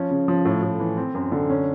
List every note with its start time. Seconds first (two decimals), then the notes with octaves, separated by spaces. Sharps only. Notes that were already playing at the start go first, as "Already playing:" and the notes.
Already playing: F3 C#4
0.10 C#3
0.28 F3
0.45 A2
0.63 A2
0.80 E3
0.97 C4
1.14 F#2
1.32 D3
1.50 C#4